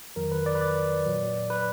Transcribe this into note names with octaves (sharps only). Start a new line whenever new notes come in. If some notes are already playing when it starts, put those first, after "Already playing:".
F2 D#3 F#3 A#4
B4
D5
B4
D5
A#2 F#3
B4